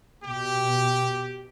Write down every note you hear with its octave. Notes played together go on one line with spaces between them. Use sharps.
B2 G4